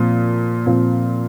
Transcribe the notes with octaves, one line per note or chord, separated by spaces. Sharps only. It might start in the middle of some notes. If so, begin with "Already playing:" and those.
Already playing: A#2 F3 C4
A#2 F3 C4